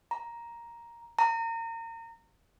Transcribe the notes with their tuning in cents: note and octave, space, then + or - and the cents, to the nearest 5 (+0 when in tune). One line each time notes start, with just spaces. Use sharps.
A#5 +5
A#5 -30